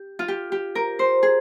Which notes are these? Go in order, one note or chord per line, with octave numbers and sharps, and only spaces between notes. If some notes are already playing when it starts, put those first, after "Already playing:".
Already playing: G4
F4
G4
G4
A#4
C5
G#4